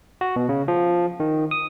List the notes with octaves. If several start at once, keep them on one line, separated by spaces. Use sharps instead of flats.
F#4
B2
C#3
F3
D#3
D#6